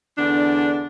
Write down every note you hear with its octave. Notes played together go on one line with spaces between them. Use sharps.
E2 D3 D4